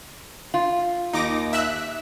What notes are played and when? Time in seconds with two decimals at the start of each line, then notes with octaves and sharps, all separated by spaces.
0.54 F4
1.13 D#2 D#4 D6 A#6
1.53 E5 E6 F#6